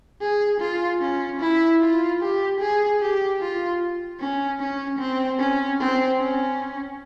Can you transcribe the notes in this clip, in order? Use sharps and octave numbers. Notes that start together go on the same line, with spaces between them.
G#4
F4
C#4
E4
F4
G4
G#4
G4
F4
C#4
C#4
C4
C#4
C4
C#4